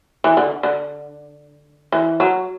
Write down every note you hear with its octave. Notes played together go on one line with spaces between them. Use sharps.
E3
D3
D3
E3
F#3